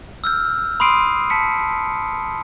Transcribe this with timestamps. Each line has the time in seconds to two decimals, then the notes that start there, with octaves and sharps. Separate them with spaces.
0.24 E6 F6 G6
0.80 B5 C6 D#6 C7 D7 D#7
1.30 A5 B6 C#7